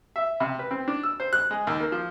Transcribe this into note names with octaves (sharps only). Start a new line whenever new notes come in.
E5
C3
B4
C4
D4
E6
C5
F#6
G#3
D#2
A#3
F3